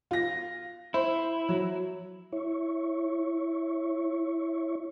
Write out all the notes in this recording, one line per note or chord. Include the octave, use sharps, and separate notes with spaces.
F4 A#6
E4 C5
F#3
E4 C#5